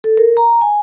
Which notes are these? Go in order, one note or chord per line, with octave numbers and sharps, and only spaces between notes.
A4
A#4
A#5
G#5